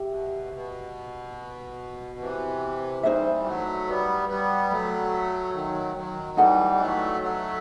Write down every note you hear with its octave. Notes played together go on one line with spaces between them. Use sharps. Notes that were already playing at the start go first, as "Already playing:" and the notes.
Already playing: G4 E5
B2
C3
B2
C3 E3
E3 G3 D#4 F#4 C5 E5
F#3 A3
G3 B3
G3 B3
F#3 A3
D#3 F#3
D#3 F#3
E3 G3 D#4 A4 D#5 F#5
F#3 A3
F#3 A3